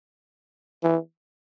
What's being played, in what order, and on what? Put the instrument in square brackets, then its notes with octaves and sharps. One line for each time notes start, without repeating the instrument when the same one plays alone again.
[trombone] E3